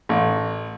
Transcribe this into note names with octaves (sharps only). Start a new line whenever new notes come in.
A1